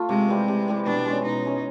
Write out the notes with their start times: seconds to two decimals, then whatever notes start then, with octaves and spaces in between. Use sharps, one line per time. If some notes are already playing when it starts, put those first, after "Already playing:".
Already playing: A3 F4
0.09 C3 G#3
0.28 E3 G3 C4
0.48 C3
0.68 E3 G3 C4
0.86 B2 D4
1.06 G#3 C#4
1.25 B2 D#4
1.45 G#3 C#4